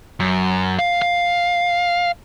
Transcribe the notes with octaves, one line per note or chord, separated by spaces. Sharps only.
F#2
F5
F5